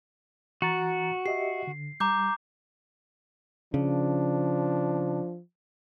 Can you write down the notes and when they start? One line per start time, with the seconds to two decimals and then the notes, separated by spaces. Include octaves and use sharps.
0.62 E3 F#4 A#5 A6
1.26 G4 D#5 E5 C7
1.67 D3
2.00 G3 A#5 D6 G6
3.74 C#3 F3 D4